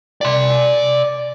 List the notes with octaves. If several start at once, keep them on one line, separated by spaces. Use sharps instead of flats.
D5 C6